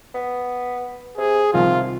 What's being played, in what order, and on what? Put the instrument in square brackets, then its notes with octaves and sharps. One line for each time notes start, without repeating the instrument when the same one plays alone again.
[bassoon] B3
[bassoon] C3 [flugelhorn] G#4
[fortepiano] C2 D#3 F3 [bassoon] C3 [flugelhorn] F4